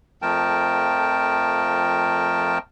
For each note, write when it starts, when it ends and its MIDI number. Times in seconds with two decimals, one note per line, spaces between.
0.22 2.58 41
0.22 2.58 53
0.22 2.58 57
0.22 2.58 70
0.22 2.58 79
0.22 2.58 81